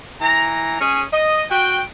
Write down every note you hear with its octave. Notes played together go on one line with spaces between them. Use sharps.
E3 A#5
C#4 G#4
D#5
F#4 G5